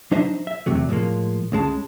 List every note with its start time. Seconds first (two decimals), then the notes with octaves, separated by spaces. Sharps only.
0.11 F#3 D4 D#4 C5 D#5 E5
0.47 E5
0.66 E2 C3 F#3 A3
0.89 A2 F3 G#3 A#3
1.52 C#2 C#3 G#3 A5